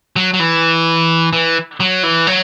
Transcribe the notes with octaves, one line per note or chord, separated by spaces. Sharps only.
F#3
F#3
E3
E3
F#3
E3
F#3